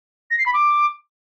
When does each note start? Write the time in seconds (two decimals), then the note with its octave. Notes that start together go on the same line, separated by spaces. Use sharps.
0.31 A#6
0.38 C7
0.46 B5
0.54 D6